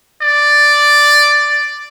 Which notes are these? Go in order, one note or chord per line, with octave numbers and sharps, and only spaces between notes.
D5